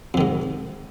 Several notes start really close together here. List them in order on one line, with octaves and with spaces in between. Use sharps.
F2 D#3 G#2